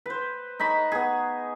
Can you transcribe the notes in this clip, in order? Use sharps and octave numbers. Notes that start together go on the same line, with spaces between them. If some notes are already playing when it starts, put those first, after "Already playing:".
B4 C5
D#4 A5 B5 C#6
B3 G#4